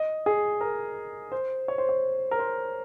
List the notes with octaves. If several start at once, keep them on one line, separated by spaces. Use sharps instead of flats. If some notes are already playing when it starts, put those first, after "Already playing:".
Already playing: D#5
G#4
A#4
C5
C#5
C5
C#5
A#4
C5